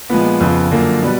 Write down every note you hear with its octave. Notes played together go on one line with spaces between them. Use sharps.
A#2 F3 G#3 B3
F2 C#3 F3
F#2 D3 F3 A#3
B2 G3 B3